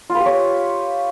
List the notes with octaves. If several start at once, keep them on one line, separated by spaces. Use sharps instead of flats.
F4
B4
G4
C#5